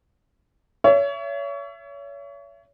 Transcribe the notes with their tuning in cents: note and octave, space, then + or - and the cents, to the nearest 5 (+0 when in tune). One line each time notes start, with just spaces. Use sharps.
C#5 +30 E5 +30